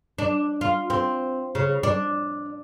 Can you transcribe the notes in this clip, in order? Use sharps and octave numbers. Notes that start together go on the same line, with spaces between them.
D4
F4
C4
C#3
D4